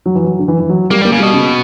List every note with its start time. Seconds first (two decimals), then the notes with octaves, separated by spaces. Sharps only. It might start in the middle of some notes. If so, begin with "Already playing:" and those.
0.06 F#3
0.15 E3
0.24 F#3
0.39 D3
0.48 E3
0.60 E3
0.69 F#3
0.91 G3 A#3
1.02 G3
1.05 A#3
1.12 C#3
1.19 B2 G3
1.33 C#3